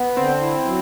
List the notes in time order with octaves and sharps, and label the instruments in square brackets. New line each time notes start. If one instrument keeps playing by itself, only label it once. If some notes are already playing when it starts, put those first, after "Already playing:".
Already playing: [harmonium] B3
[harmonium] D3 [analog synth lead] C4
[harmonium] E4
F#3